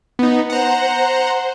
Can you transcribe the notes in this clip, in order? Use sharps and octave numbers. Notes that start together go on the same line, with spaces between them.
B3 D#4
C5 F#5 A#5